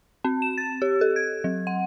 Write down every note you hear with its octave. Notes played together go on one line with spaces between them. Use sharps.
C4
E7
A6
G4
A4
G#6
F#3
F#5